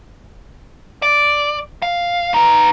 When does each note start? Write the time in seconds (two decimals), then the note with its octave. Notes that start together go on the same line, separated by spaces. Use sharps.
1.02 D5
1.82 F5
2.34 D#4 B4